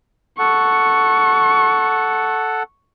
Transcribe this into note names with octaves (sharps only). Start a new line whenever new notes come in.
A4 F#5 C#6